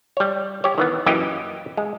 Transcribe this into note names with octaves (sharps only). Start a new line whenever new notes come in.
G3 C#5
G4 C#5
D#3 E3 B3
F#2 E3 A#3 G4 D#5
G#3